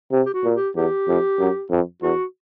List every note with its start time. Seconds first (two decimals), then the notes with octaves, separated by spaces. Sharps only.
0.12 C3
0.26 G4
0.34 F#4
0.44 A#2
0.54 G4
0.76 E2 G4
1.08 F2
1.39 F#2
1.71 F2
2.02 E2 F#4